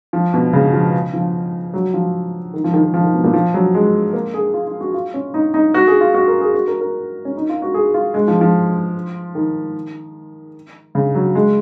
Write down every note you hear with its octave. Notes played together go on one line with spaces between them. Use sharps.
F3
B2
C#3
F3
F3
F#3
F3
D#3
F3
D#3
D#3
F3
D#3
B2
A#2
F3
F#3
G#3
A#3
G#4
F4
F4
F#4
F4
C#4
D#4
D#4
F#4
G#4
F4
F#4
A#4
G#4
F#4
A#4
A#4
C#4
D#4
F4
F#4
G#4
F4
G#3
F3
F3
D#3
C#3
F#3
G#3